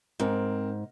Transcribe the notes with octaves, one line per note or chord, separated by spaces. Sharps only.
G#2 C4 A#4